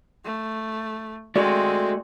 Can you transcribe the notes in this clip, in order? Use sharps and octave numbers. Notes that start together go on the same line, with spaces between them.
A3
G#3 A3 C4 F#4 D5